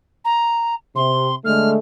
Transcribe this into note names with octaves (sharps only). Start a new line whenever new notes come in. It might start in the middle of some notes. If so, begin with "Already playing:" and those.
A#5
C3 C6
D3 G#3 A3 F6